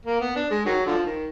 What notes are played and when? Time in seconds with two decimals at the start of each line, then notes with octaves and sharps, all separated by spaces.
0.06 A#3
0.20 B3
0.36 D4
0.50 G#3
0.65 D#3 F#3
0.86 D3 F3
1.06 D#3